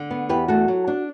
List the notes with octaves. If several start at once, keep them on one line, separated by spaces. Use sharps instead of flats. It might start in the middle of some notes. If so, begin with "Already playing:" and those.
Already playing: D3
B3
E2 G4 B4
A3 F#4 A4
F#3
D4